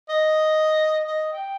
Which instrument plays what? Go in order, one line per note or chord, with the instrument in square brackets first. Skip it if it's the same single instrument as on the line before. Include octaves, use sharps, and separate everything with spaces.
[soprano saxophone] D#5
D#5
G5